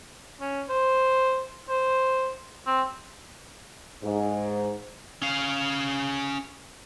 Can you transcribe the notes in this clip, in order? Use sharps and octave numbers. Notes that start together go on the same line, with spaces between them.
C#4
C5
C5
C4
G#2
C#4 F5